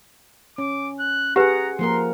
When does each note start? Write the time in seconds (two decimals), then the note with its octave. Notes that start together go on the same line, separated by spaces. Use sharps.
0.58 C#4 D6
1.00 F#6
1.36 G4 G#4 B4 F#5 A#5
1.79 F3 A#3 A#4 C6